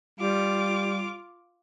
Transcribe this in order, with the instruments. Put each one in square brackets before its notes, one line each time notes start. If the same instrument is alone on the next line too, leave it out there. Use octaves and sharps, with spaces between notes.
[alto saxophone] G3 [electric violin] F4 D6